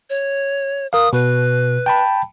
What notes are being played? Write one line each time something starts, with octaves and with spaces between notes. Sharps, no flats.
C#5
A#4 F5 D#6
B2 B4
G5 A5 B5